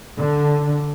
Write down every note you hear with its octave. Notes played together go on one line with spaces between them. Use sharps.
D3